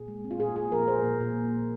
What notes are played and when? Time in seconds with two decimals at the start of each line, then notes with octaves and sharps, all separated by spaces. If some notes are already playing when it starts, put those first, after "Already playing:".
Already playing: A#2 G#4
0.08 G#3
0.24 C4
0.31 F4
0.40 A#2 G#4
0.56 A#2 G#4
0.72 F3 A#4
0.88 A#3 C5
1.04 A#2
1.20 A#2